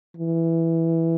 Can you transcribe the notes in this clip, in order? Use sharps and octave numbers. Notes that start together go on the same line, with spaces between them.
E3